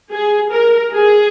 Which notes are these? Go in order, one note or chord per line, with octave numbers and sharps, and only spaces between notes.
G#4
A#4
G#4